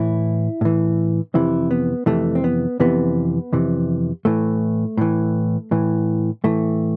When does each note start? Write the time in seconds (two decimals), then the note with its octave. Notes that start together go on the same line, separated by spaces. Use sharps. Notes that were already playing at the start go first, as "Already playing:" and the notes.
Already playing: A2 E3 E4
0.61 A2 E3
1.34 F2 C3 E3 E4
1.71 B3
2.06 F2 C3 E3 A3
2.35 C4
2.44 B3
2.80 F2 C3 E3 B3
3.53 F2 C3 E3
4.25 A2 E3 A3
4.98 A2 E3
5.71 A2 E3
6.44 A2 E3 A3